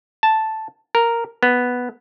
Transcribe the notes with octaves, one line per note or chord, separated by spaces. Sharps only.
A5
A#4
B3